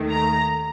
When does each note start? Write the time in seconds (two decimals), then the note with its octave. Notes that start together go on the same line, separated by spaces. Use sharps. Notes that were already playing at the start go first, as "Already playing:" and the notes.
Already playing: D#2 D#3 A3
0.11 A#5